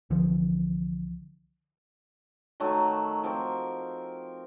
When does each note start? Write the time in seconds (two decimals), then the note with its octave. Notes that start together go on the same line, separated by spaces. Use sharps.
0.10 C2 D3 E3 F3
2.60 D#3 F#3 A3
3.24 F3 C4 A#4